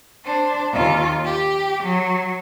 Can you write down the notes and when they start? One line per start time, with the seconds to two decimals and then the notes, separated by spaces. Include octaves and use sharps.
0.25 D4 C5
0.72 D#2 F4
1.25 G4
1.83 F#3